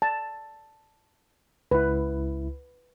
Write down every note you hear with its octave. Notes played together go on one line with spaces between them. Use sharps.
A5
C#2 E4 B4